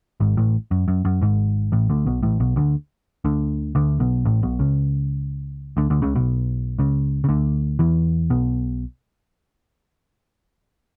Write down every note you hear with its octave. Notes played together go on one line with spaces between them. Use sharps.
G#1 G#2
A1 A2
F#2
F#2
F#2
G#1 G#2
A1 A2
D2 D3
B1 B2
A1 A2
B1 B2
D2 D3
D2 D3
D2 D3
B1 B2
A1 A2
B1 B2
C#2 C#3
D2 D3
D2 D3
C#2 C#3
B1 B2
C#2 C#3
C#3
D2 D3
E2 E3
B1 B2